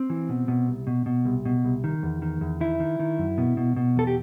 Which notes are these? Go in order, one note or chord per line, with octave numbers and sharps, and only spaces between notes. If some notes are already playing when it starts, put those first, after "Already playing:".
Already playing: C4
E3
B2
B2
C2
B2
B2
C2
B2
C2
D#3
E2
D#3
E2
D#3 E4
D#3
D#3
F#2
B2
B2
B2
E2 A4
G4